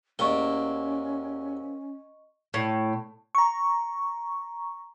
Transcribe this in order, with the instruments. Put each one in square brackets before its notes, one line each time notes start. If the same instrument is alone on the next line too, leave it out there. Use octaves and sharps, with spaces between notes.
[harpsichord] E2 C3 [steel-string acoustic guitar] A#3 C4 [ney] C#4 [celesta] D#5 C#6 G7
[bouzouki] A2
[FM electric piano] A#5 C#6